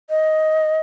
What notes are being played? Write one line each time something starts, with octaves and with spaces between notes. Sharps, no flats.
D#5